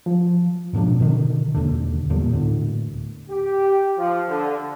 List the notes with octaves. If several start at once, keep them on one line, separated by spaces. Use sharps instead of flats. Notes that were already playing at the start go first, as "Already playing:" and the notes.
F3
G#2 B2 F3 D4
B2 D3 D#3
E1 D#2 D3
E2 A#2 G3 B3
D2 A2 D3
G4
F3
D3